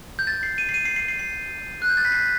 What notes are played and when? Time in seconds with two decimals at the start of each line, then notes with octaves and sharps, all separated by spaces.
0.19 G6
0.27 A6
0.43 C7
0.58 D#7
0.69 C7
0.74 D#7
0.85 C7
0.96 C7
1.08 C7
1.19 C7
1.82 F#6
1.90 G6
1.97 A6
2.05 B6
2.12 C7